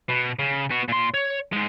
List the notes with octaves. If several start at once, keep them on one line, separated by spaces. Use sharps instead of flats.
B2
C#3
B3 F#4
A#2 C6
C#5
G#2 G#3